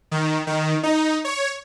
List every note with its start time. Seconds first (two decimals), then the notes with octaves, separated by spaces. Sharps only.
0.11 D#3
0.47 D#3
0.83 D#4
1.25 C#5